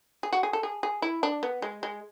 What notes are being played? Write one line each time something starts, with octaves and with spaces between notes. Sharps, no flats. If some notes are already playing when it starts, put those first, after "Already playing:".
G#4
F#4
G#4
A4
G#4
G#4
E4
D4
B3
G#3
G#3